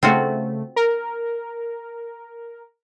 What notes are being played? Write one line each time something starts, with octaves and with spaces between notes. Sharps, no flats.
C#3 A3 C4 F4 F#4
A#4